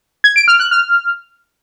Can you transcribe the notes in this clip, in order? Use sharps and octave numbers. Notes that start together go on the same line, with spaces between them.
G#6
D7
F6
F#6
F6